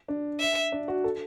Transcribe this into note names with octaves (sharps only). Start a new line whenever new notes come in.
D4
E5
D4
F#4
A4